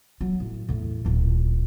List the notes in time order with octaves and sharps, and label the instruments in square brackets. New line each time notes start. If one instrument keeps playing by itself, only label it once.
[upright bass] F#3
A2
E2 A2
D1 A#2